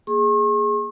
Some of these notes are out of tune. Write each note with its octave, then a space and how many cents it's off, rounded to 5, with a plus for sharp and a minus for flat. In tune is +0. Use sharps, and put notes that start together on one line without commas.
A#3 +0 G#4 +0 C#6 -45